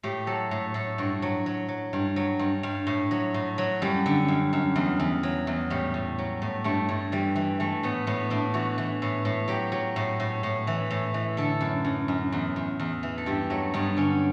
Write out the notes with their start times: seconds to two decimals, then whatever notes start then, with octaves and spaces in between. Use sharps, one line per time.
0.03 A2 G4
0.27 F#3 A4
0.51 A2
0.74 A2 A4
0.98 G2 F#4
1.22 F#3
1.46 F#3
1.69 F#3
1.93 G2
2.16 F#3
2.39 G2
2.63 G2
2.87 A2
3.11 F#3
3.34 A2
3.58 F#3
3.82 F#2 G3
4.06 D3
4.28 F#2
4.53 F#2
4.76 E2
5.00 E2
5.23 F#3
5.47 E2
5.70 A2 G3
5.94 A2
6.19 F#3
6.42 A2
6.64 G2 A3
6.89 G2
7.12 E3 G3
7.36 E3
7.60 E3 A3
7.83 A2 B3
8.07 A2 B3
8.30 A2 D4
8.54 E3 F#4
8.78 E3
9.02 A2
9.25 A2
9.48 F#3 G4
9.72 F#3
9.96 A2
10.20 A2
10.43 A2
10.67 E3
10.91 A2
11.14 E3
11.37 D3 A4
11.61 F#2
11.85 F#2
12.08 F#2
12.32 E2
12.56 E2
12.80 E2
13.03 E3
13.18 A4
13.26 G2 G4
13.50 F#3 A3
13.74 G2 B3
13.97 D3 C#4